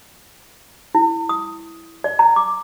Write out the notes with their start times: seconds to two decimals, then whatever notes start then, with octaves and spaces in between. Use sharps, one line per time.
0.95 E4
1.29 D#6
2.04 D5
2.19 A#5
2.36 D6